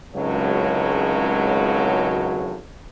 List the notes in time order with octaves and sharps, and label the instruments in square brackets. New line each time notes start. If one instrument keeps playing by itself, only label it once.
[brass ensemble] G#1 C#2 A2 C#3 F#3